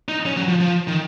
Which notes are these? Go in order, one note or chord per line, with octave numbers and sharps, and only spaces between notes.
D#4
C#4
F#3
F3
F3
D#3